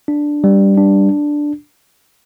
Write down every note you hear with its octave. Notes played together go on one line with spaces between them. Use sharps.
D4
G3
D4